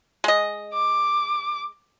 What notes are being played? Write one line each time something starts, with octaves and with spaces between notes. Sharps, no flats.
G#3 D#5
D6